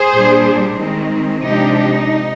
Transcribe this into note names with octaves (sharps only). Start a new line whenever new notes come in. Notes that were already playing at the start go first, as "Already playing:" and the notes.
Already playing: G#4 C5
A#2 G3 D4
D#3 G#3 C4
C3 F3 G#3 D4 D#4 G4
D#4